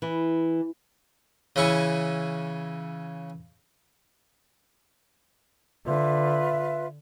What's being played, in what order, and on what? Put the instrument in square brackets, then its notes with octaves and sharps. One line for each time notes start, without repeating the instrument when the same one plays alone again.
[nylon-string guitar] E3
[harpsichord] C#3 E3 C#4 E4 C#6
[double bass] D3 [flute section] F4 B4 E5